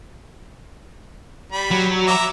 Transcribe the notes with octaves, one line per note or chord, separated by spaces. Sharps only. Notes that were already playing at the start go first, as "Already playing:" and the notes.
G3 B5
F#3
E5 A#5 D6